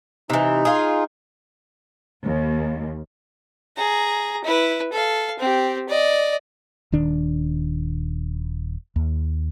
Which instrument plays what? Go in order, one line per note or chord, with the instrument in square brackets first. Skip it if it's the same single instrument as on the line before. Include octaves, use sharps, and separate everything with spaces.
[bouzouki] C3 E3 [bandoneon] D#4
[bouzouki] F4 G#4
[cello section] D#2
[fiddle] G#4 A#5
E4 B4
A4 F5
C4 G4
D5 D#5
[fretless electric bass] D#1 D#3 D4
D#2